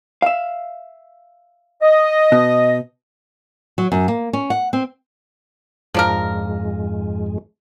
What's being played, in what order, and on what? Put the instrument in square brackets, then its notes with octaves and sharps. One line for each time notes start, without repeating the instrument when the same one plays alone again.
[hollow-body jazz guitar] E5 F5
[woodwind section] D#5
[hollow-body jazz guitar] B2
[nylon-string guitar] F#3
F#2
A#3
C#4
F#5
C4
[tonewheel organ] F2 G#2 G#3 [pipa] F3 D4 A#4